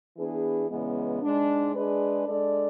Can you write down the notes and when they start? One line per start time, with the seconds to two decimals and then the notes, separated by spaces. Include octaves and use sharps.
0.17 E3 B3 D4 G#4
0.70 E2 C#3 G#3 B3
1.22 G#2 G#3 D4
1.75 G#3 D4 G#4 B4 D5
2.28 G#3 D4 A4 D5